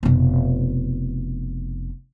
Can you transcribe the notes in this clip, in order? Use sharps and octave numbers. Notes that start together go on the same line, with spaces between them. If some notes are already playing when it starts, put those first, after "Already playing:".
F1 B2